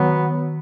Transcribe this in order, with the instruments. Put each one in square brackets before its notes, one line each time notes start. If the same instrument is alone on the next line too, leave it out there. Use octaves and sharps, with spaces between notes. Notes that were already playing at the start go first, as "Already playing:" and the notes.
Already playing: [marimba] D#3 [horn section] F#3 B3